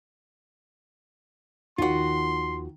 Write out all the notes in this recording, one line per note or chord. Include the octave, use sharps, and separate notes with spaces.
D#2 D#3 F3 F4 F#4 C6